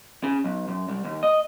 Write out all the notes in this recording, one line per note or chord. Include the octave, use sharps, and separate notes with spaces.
C#3
B1
F#2
C2
D#2
D#5